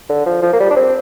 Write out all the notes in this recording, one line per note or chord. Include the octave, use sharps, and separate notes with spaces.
D3
F3
F3
A#3
G3
D4
C4